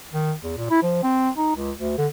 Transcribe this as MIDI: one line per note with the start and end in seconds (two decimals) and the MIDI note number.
0.13 0.34 51
0.43 0.55 40
0.57 0.68 46
0.70 0.82 64
0.83 0.99 53
1.03 1.30 60
1.38 1.54 63
1.56 1.72 37
1.77 1.98 38
1.98 2.07 50